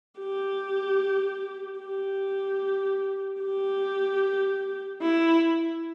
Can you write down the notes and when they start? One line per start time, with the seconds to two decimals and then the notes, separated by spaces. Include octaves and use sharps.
0.19 G4
1.80 G4
3.41 G4
5.02 E4